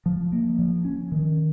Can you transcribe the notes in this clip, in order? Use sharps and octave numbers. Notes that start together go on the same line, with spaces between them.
F3
A#3
F3
C#4
D#3